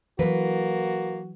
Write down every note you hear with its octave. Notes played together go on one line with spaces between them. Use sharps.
E3 F#3 A#3 F#4 B4